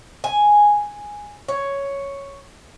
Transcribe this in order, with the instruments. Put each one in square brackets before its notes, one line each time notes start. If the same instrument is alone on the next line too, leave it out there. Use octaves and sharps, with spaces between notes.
[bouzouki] G#5
C#5